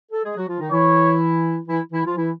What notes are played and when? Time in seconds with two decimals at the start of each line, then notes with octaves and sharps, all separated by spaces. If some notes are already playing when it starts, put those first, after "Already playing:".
0.12 A4
0.23 G#3 G#4
0.35 F#3 F#4
0.48 F3 F4
0.60 D#3 D#4
0.71 E3 E4 C#5
1.68 E3 E4
1.92 E3 E4
2.04 F3 F4
2.16 E3 E4